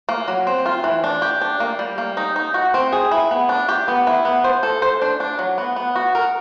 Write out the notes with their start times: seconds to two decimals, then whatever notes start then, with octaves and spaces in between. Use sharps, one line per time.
0.09 A#3
0.28 F#3
0.47 C4
0.66 F4
0.84 E3
1.04 D4
1.22 G4
1.41 D4
1.60 A#3
1.79 G3
1.98 A#3
2.17 D#4
2.36 D#4
2.54 F#4
2.74 C4
2.92 G#4
3.11 E4
3.31 B3
3.49 D4
3.69 G4
3.88 B3
4.07 E4
4.25 B3
4.44 C5
4.63 A4
4.82 C5
5.02 D4
5.20 D4
5.39 F#3
5.58 B3
5.76 B3
5.95 F#4
6.15 A#4